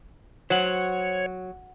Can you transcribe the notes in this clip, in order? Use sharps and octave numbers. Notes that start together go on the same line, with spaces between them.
F#3 C5 C#5 F#5